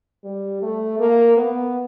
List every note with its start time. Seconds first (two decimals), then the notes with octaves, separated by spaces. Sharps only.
0.24 G3
0.62 A3
0.99 A#3
1.37 B3